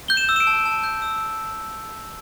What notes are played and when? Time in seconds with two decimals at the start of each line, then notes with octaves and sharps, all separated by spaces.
0.08 G6 G7
0.17 E7
0.29 E6
0.36 E7
0.40 D7
0.47 A5
0.65 A5
0.84 G6
1.02 E6